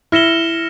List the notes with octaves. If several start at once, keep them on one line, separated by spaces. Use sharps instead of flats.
E4 F6 A#6 C#7 E7 G7